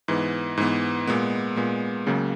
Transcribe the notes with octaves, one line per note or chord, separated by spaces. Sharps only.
G#2 E3 B3
G#2 E3 B3
A#2 G#3 B3
A#2 G#3 B3
C#2 C#3 F#3 A#3